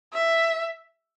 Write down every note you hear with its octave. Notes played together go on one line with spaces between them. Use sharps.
E5